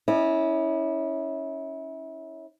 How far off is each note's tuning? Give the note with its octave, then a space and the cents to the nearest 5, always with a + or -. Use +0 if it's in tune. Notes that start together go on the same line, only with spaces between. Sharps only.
C#4 +0 E4 -30 D5 +45